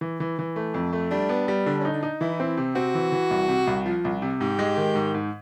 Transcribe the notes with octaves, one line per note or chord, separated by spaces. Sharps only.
E3
E3
E3
A3
F2
A3
G3 D4
B3
G3
D3 D4
C#4 D#4
D4
D#4
E3 E4
C4
C3
C4 F#4
E3
E3
C2
C3
C2
F3
C2
C3
G#2 G4
G#3
D#3
G#2
G#2